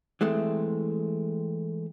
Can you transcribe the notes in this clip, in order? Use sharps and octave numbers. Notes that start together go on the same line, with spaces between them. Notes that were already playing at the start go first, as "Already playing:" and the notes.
E3 G#3 A3 C4